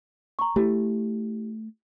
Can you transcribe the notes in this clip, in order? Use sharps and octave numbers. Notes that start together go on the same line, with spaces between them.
A#5 C#6
A3 E4 G4